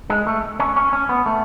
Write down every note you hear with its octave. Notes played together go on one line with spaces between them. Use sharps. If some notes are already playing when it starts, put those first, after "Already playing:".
G#3
A3
C#4
C#4
C#4
B3
A3